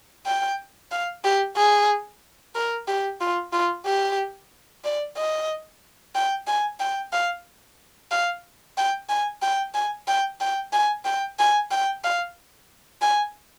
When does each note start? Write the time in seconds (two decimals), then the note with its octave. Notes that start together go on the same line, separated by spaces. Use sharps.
0.26 G5
0.92 F5
1.24 G4
1.57 G#4
2.55 A#4
2.88 G4
3.21 F4
3.52 F4
3.86 G4
4.85 D5
5.17 D#5
6.15 G5
6.47 G#5
6.80 G5
7.12 F5
8.11 F5
8.77 G5
9.09 G#5
9.42 G5
9.74 G#5
10.07 G5
10.41 G5
10.73 G#5
11.05 G5
11.39 G#5
11.72 G5
12.04 F5
13.02 G#5